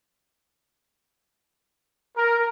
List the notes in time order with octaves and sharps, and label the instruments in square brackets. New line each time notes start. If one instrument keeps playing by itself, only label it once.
[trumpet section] A#4